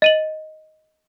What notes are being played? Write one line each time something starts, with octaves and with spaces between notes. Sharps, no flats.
D#5 D#7 F#7